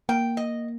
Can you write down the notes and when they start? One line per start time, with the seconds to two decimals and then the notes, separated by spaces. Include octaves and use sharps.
0.09 A#3 G5
0.37 D#5